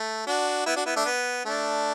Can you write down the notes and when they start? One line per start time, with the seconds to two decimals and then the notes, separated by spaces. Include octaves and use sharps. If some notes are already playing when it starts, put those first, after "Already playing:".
Already playing: A3
0.27 D4 F#4
0.66 B3 E4
0.76 D4 F#4
0.86 B3 E4
0.96 A3 D4
1.06 B3
1.45 A3 D4